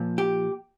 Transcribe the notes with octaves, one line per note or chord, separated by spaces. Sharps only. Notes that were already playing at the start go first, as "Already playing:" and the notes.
Already playing: A#2 F3
G4